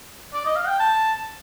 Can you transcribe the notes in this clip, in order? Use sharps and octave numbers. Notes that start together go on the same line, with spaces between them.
D5
D#5
F5
G5
A5